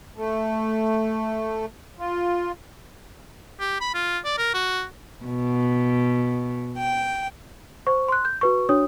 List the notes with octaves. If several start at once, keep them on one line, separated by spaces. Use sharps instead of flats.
A3
F4
G4
B5
F4
D5
A#4
F#4
B2
G5
C5 C#6
C6 F#6
G6
F#4 B4 C#6
D4 F#4 C#5 D#6